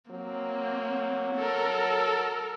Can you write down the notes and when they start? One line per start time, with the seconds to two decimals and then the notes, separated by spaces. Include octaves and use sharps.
0.11 F#3 A#3 C4
1.35 A4 A#4